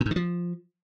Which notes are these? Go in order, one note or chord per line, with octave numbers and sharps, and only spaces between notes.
A#2
G#2
D#3
F3